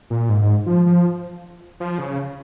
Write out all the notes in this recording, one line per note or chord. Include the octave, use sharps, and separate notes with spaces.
A#2
G#2
G#2
F3
F3
F3
C#3